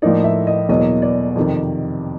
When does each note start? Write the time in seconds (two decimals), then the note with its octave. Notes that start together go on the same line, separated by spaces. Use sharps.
0.02 A2 F3 A#3 D#4 D5
0.24 E5
0.47 D#5
0.69 E2 B2 F#3 A#3 D#5
1.02 D5
1.36 F2 C3 D#3